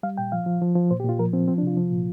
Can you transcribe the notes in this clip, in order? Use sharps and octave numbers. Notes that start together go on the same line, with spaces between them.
G3 F5
A#2 G5
F3 F5
F3
F3
F3
A#2 C5
G4
A#2 F4
F3 A#4
F3 C4
F3 C4
D4
C3
F4
F3
A#2